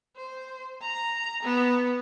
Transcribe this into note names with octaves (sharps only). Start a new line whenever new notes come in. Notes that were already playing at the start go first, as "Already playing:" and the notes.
C5
A#5
B3